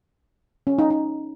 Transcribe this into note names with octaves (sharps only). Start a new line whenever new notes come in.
C#4
D#4
D#4